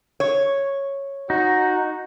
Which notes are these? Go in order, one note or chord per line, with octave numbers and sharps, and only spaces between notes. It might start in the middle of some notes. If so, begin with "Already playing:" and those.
C#5
D#4 F#4